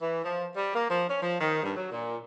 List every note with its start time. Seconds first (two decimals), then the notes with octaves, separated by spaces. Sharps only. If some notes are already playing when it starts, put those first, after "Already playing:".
0.01 E3
0.24 F3
0.56 G3
0.74 A#3
0.89 F3
1.08 C#4
1.21 F3
1.41 D#3
1.62 G2
1.76 F#3
1.91 A#2